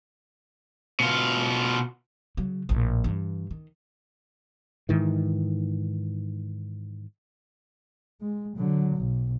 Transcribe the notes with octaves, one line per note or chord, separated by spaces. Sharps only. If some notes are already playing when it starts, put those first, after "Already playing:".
B2 F4
C#3 F#3
A#1 A2
G2 E3
D#3
G#2 D#3 E3
G#3
D3 F#3
B1